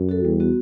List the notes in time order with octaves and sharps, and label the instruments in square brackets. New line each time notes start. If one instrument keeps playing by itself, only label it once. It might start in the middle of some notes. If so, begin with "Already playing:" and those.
Already playing: [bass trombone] F#2
[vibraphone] F#4 A4
[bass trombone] E2 [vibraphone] G3
[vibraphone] B3 F#4